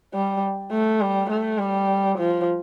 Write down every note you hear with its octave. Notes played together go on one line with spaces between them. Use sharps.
G3
A3
G3
A3
G3
F3